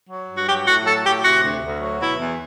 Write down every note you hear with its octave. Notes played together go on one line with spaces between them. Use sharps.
F#3
G2
F#4
F#3 G4
A2 F#4
F#3 A4
A2 G4
C3 F#4
D2
D2
F#3
B2 E4
E2